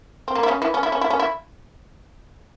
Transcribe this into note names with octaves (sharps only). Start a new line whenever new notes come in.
C4
A#3
E4
C#3 C#4
E3 E4
C#4
E4
C#4
E4
C#4
E4